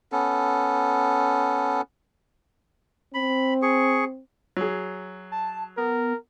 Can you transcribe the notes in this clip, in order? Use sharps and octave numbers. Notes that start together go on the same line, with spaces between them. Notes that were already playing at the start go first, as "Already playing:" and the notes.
B3 C#4 A4
C4 B5
G#4 C#6
F#3 G#4
A5
B3 A#4